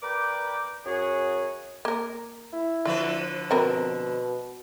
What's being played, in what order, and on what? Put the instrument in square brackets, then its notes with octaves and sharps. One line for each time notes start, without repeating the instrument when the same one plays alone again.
[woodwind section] A#4 B4 D5 G5 D6
F#2 F#4 G#4
[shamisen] A#3 A#4
[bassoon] E4
[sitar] D3 F3 B4 [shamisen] F4
[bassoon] B2 [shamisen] B3 C4 A#4